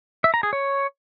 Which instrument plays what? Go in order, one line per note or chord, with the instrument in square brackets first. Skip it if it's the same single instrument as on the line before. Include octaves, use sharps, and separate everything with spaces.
[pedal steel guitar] E5
A#5
G#4
C#5